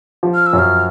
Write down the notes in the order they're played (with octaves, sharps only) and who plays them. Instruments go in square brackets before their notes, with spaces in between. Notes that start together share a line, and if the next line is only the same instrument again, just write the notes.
[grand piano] F3
[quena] F6
E6
[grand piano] F#2 F#3
[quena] F6